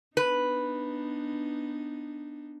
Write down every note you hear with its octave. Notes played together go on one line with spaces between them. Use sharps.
B3 D4 D#4 B4